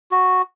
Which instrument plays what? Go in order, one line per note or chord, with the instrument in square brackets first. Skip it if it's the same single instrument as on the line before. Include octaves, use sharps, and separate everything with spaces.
[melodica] F#4